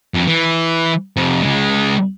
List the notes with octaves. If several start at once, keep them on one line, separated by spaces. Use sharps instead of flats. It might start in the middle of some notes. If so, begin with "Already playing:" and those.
F2
E3
F2 C3
C#2 G#3